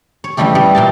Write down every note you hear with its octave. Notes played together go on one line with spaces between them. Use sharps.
C#5
C#3 E3 G3 A3 G4
G3 B3
A#2 G5 A5